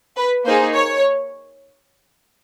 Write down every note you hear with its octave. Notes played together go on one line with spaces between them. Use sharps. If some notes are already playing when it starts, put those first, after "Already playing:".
B4
A#3 D#4 G#4 C5
C#5